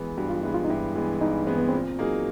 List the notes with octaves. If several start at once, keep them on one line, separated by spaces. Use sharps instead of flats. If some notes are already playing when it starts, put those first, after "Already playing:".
Already playing: E3 G#3 B3
G2 F#4
F4
E3 G#3 B3 E4
F4
D#4
G2 E4
E3 G#3 B3
G2 D#4
E3 G#3 B3 C4
B3
A#2 C4
F#3 A#3 D#4 G#4